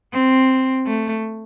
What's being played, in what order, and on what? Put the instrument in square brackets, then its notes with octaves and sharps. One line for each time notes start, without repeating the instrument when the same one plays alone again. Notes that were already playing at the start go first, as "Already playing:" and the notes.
[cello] C4
A3